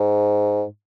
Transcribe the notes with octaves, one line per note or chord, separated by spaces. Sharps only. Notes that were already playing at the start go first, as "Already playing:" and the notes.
Already playing: G#2